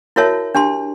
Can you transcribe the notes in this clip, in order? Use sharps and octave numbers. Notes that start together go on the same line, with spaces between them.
E4 F#4 A#4 C#5 E5 A5
D4 G4 A5 C6